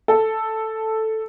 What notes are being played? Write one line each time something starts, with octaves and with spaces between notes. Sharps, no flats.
A4